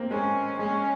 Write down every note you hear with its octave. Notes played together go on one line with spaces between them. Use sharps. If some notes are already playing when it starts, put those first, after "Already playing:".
Already playing: A#3 C4
G#3 C#4
G#3 C#4